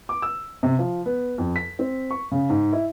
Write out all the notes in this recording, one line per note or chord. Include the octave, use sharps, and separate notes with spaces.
D6
E6
C3
F3
B3
F2
B6
C4
C#6
C#3
G#2
E4